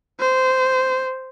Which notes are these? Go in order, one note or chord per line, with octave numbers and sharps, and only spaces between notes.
C5